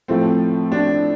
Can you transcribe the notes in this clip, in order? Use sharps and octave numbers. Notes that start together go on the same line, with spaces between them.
A2 F3 A3 C4
D4